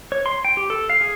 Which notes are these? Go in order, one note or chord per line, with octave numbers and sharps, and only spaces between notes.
C#5
C6
G5
G4
A4
F5
G#4